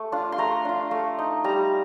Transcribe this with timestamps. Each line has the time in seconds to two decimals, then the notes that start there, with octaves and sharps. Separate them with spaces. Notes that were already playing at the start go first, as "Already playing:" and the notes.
Already playing: A3
0.12 D4 F4
0.32 C6
0.38 A3 A#5
0.65 D4 F4
0.91 A3
1.19 D#4
1.44 G3 A#5